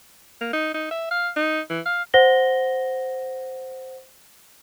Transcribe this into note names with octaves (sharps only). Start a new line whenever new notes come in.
A#3
D#4
D#4
E5
F5
D#4
E3
F5
C5 F#5 A#6 G7